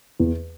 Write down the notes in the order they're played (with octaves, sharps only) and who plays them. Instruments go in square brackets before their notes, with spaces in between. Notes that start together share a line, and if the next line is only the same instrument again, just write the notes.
[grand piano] E2